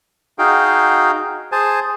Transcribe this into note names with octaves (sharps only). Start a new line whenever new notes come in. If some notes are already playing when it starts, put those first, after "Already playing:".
D#4 F#4 G#4 F5 G5
G#4 C5 G#5 A5